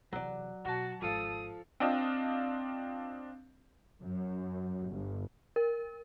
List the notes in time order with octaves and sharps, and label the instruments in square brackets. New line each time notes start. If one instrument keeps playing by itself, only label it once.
[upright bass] E2 C3 [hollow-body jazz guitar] F#3 D5
[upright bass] B2 [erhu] F#4 [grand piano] F#5 A5
[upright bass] G#1 [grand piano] F3 A4 F5 [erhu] D#6
[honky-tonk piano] C4 D4 F4 D#5
[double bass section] F#2
G1
[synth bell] A#4